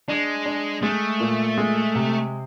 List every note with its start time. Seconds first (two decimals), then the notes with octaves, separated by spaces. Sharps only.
0.08 G#3 D4
0.46 D4
0.83 G#3 A3
1.20 A#2
1.58 G#3
1.95 C3